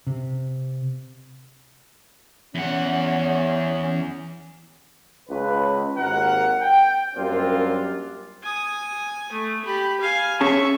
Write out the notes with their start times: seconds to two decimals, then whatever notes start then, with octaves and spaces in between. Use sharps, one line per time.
0.07 C3
2.55 E2 C#4 F#5
5.29 C#2 B4
5.97 G#1 D#2 D#3 A#4 F#5
6.61 G5
7.16 F#2 G3 A#3 C4 D4 F4
8.43 G#5 D#6
9.32 A3
9.65 G4 B5
10.01 F5 G#5
10.41 C#4 G#4 E5 A5 C#6